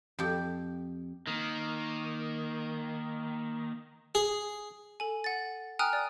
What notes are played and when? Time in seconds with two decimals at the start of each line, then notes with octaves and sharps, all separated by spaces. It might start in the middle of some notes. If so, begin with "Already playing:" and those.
0.19 F2 G4
1.27 D#3 A#3
4.15 G#4
5.00 A4 G#5
5.24 F#5 A6
5.79 G5 G#5 A#5 D#6 F6 F#6
5.93 D5